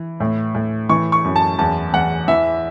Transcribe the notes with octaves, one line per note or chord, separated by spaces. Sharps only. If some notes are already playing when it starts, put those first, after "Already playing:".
Already playing: E3
A2
A2
E3 C#6
C#6
F#2
A5
E2 A5
E2 F#5
E3 E5